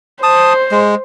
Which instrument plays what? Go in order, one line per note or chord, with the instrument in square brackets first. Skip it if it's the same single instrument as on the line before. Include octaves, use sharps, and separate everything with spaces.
[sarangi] C5 [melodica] A5 D#6
[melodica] G#3